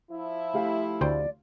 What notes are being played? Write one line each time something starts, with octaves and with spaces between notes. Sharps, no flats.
F3 E4
A3 G4 E5 F5
D2 C5 D5 G5